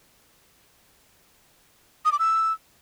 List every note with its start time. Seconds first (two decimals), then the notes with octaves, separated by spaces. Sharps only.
2.05 D#6
2.12 D6
2.19 E6